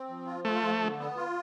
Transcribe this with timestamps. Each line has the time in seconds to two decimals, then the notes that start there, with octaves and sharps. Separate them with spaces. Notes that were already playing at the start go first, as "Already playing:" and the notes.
Already playing: C4
0.09 F3
0.26 F4
0.45 A3 F4
0.62 F3
0.81 D3
0.99 B3
1.17 F4